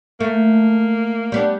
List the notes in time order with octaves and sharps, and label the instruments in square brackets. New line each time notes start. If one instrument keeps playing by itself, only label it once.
[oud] A3 [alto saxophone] A#3
[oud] G3 B3 D4